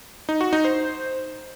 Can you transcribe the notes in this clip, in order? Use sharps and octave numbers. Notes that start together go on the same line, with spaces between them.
D#4
F#4
D#4
C5